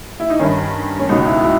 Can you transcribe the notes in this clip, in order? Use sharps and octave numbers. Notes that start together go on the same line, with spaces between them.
E4
D#4
G2 D#3 C#4
C#4
C#2 B2 D#4
E4
E4